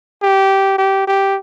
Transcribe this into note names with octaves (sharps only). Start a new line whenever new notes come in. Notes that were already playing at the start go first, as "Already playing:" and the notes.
G4
G4
G4